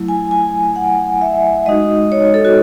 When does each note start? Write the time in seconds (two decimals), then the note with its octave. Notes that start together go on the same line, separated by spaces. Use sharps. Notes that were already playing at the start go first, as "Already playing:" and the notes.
Already playing: F#3 A3 E4
0.08 G#5
0.31 G#5
0.76 F#5
1.22 E5
1.66 G#3 D#4 F#4 D#5
2.12 C#5
2.22 C#5
2.34 A4
2.45 F#4